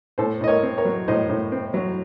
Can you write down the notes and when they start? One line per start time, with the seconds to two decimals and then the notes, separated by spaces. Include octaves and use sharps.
0.18 A2 A4 C5
0.41 A2 D#5
0.48 A#4 C#5
0.63 C4
0.78 A#4 C#5
0.85 F#3
1.08 A2 C5 D#5
1.29 A2
1.52 C4
1.74 F#3